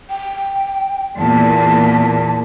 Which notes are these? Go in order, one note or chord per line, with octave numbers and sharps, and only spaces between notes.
G5
E2 A#2 A5